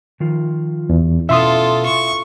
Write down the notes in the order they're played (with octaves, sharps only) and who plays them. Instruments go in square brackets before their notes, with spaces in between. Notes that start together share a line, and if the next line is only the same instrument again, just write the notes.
[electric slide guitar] D#3 F3 F4
[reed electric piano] E2
[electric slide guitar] B2 C#4 E4 [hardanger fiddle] F4 A4 [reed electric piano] E5 C6 D#6
[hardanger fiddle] C#6